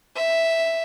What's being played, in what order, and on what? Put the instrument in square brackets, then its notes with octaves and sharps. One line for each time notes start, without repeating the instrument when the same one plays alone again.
[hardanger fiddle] E5